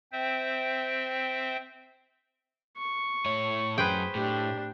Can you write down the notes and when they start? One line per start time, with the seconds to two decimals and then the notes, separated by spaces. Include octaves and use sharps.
0.12 C4 C5 E5 G5
2.77 C#6
3.26 A2 C#5
3.78 F#2 G#4 B4 C5 G5
4.15 A2 D4 G4